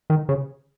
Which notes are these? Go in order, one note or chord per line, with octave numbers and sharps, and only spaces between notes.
D#3
C#3